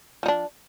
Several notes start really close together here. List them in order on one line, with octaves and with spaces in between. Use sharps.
F3 D#4 D4